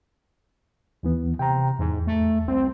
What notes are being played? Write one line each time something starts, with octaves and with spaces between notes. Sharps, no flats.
D#2 E3 B3
C3 G5 A#5
E2 G#2
A3
C2 C4